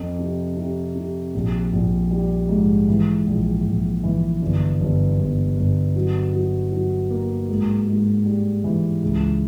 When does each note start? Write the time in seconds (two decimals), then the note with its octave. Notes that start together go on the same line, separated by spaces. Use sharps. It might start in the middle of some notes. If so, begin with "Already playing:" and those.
Already playing: F2
0.19 C3
0.57 C3
0.95 C3
1.34 A#1
1.72 A#1
2.11 G3
2.49 G#2
2.88 E3
3.26 A#1
3.65 A#1
4.03 E3
4.42 G1
4.80 G1
5.19 G1
5.57 G1
5.96 F#3
6.34 F#3
6.72 F#3
7.10 A#3
7.49 G#2
7.87 G#2
8.26 G3
8.64 E3
9.02 C#2